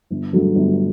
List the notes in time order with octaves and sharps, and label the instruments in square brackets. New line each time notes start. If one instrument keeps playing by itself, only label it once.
[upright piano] G1
G2 D3 F#3 A3
G1